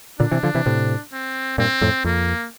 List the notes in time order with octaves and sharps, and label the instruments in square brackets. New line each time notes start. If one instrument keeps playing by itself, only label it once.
[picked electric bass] A#2 D3 [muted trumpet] D4
[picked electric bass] C3 E3
D3 F3
C3 E3
A2 C3
[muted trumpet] C4
[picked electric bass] G2 A#2 [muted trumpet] C4
[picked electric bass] F2 A2
[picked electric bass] F2 [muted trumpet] A#3